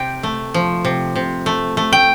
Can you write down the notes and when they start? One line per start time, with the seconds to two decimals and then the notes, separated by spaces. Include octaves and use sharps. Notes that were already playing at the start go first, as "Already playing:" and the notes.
Already playing: C3 G5
0.23 A3
0.54 F3
0.85 C3
1.16 C3
1.46 A3
1.77 A3
1.93 G5